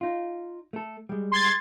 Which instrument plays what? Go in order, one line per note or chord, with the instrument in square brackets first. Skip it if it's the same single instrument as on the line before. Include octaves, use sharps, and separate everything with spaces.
[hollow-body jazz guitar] D#4 F4
A3 A4
G3 G#3
[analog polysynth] C6 G#6 A6